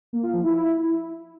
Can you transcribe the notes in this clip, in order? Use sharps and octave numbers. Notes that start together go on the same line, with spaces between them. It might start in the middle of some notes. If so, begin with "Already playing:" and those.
A#3
F4
F3
E4